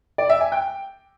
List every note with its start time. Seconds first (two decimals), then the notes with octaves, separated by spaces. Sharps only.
0.18 D5
0.30 E5
0.41 G#5
0.52 G5